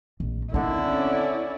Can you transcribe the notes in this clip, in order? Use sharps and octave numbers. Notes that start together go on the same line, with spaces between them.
A#1
D3 D#3 B3 C4 E4
C#4 D5